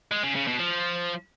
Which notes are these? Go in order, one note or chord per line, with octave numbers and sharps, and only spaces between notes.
G#3
C#3
C#3
B2
F3